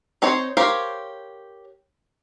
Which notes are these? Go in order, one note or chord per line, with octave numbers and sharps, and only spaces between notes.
C4 D#4 C5 C#5
G4 A#4 C5 C#5 F5